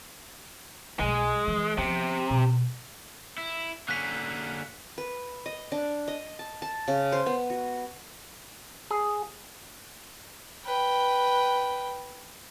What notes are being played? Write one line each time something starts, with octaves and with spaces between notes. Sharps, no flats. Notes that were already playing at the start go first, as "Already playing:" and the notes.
B1 F#3 G#3
E3
C3 F3 B3
B2
E4
D3 A#3 C#4 F#6 B6
B4
D#5
D4
D#5
A5
A5
C#3
C5
B3
F#4
G#4
B4 G5